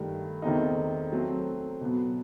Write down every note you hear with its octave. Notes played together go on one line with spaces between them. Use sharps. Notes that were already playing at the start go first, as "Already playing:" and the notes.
Already playing: G2 D#3 A3
E2 D#3 A3 C4 D#4
F#3 A3 C4
B2 F#3 B3